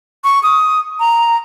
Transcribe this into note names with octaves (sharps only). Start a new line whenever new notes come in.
C#6
D#6
A#5